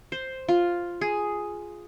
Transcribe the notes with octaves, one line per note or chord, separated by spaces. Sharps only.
C5
F4
G#4